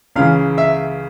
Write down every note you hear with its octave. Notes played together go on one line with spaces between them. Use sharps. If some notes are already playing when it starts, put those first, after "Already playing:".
C#2 C#3 E3 F5
E5